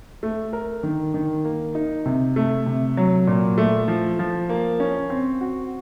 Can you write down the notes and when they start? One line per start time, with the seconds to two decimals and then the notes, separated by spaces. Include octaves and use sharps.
0.23 A3
0.53 A#4
0.83 D#3
1.14 D#3
1.45 A#3
1.75 D#4
2.06 C3
2.36 A3
2.66 C3
2.97 F#3
3.27 A#2
3.58 A3
3.88 F3
4.19 F3
4.50 A#3
4.80 C#4
5.10 C4
5.41 F#4